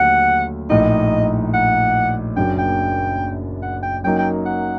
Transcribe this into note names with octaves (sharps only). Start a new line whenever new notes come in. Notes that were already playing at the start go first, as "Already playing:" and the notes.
Already playing: D#2 D3 F#3 A3 F#5
A#1 A2 A3 D#4 D#5
F#5
F#1 F#2 F#3 A#3 D4 G5
G5
F#5
G5
F#2 F#3 A#3 D#4 G5
G5
F#5